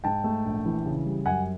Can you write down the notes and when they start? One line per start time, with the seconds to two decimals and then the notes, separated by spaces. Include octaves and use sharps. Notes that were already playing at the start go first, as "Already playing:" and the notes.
0.04 G#2 G5 A5
0.24 A3
0.45 A#1
0.65 E3
0.85 C#3
1.05 G3
1.26 F#2 F#5 G#5